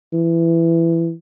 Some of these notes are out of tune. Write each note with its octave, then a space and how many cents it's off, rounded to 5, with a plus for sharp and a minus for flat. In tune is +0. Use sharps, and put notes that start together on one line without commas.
E3 +15